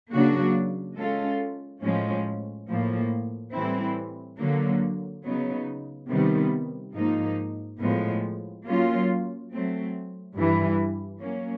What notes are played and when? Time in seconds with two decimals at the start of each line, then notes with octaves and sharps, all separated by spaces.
0.12 C#3 F#3 A#3 D4 F#4
0.97 G#3 C#4 F4 A4
1.83 A2 F3 G#3 C#4
2.69 A2 F3 A#3
3.54 A2 E3 G3 C4 E4
4.39 D3 F#3 A#3
5.24 C#3 F#3 B3 D#4
6.09 C3 D#3 G3 B3
6.95 G#2 F3 A#3 D#4
7.80 A2 F3 G#3 B3
8.66 F#3 A#3 C#4 F4
9.51 F#3 A3 C4
10.36 G2 E3 G3
11.22 F#3 A#3 C#4